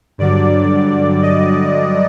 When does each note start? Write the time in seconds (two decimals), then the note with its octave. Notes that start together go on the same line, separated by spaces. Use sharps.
0.18 G2 D3 F#3 D5
1.22 D#5